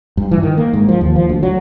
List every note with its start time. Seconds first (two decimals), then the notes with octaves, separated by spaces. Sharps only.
0.17 G2
0.31 E3
0.43 D#3
0.58 A#3
0.73 G#2
0.89 F3
1.01 D#2
1.16 F3
1.29 D2
1.43 F#3